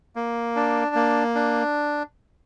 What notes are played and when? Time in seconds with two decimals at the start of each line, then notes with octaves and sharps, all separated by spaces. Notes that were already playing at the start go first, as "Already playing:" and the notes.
0.16 A#3
0.56 D4
0.95 A#3
1.35 D4